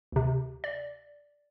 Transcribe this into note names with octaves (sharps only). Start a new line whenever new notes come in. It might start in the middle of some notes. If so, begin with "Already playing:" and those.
D2 C3
D5